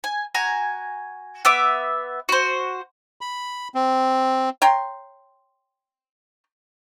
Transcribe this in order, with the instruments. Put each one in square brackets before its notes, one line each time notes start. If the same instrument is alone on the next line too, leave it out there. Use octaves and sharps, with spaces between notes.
[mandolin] G#5
F#4 G#5 A#5
B3 E5 D6
F#4 C5
[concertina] B5
C4
[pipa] C#5 G5 A#5 C6